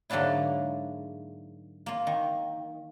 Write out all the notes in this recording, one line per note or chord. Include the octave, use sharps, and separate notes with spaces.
G#2 D3 F#3 A#3 D4 E4
A#3 F4
D#3